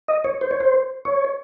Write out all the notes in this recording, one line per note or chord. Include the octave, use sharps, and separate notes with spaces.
D#5
C#5
C5
C#5
C5
C#5